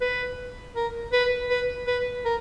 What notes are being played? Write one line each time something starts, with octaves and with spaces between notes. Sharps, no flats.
B4
A#4
B4
B4
B4
A#4